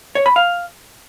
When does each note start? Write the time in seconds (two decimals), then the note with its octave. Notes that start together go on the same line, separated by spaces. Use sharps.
0.15 C#5
0.26 B5
0.36 F5